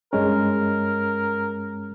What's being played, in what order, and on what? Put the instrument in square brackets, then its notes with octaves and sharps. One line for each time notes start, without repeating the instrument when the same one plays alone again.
[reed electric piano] G2 G#3 C#4 [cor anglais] A#4